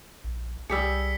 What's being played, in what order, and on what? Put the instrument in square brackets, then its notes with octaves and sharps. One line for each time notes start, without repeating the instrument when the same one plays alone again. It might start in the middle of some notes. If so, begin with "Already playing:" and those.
[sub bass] A#1
[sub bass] C2 [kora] G3 G4 G#4 [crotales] E6 B6 C#7